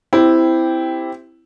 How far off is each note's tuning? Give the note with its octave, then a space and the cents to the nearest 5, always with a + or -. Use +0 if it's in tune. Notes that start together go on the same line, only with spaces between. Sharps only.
C4 -10 E4 +0 G4 +0